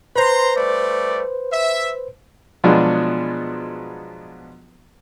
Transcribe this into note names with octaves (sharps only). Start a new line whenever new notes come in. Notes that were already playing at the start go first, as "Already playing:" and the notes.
B4 C5 A#5 C6
G3 A3 D5
E5
B2 F3 F#3 G#3 B3 D4